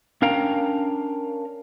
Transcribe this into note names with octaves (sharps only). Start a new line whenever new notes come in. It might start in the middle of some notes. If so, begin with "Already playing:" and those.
C#4 D4 A#4 F5 G5 A#5